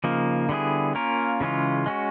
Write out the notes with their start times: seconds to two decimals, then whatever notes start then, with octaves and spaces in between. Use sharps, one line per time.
0.04 C#3 F3 A#3 D#4
0.49 D3 G3 B3 E4 G#4
0.95 A#3 C#4 F4 A#4
1.41 C#3 E3 G#3 C#4 F4
1.86 G#3 C#4 F#4